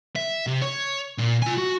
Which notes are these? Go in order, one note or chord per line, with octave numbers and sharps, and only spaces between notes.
E5
C3
C#5
A#2
F4 G#5
F#4